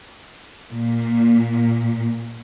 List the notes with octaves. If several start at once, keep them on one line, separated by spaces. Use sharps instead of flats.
A#2